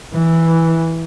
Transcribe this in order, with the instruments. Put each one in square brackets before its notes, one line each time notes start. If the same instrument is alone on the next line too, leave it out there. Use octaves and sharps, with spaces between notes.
[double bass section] E3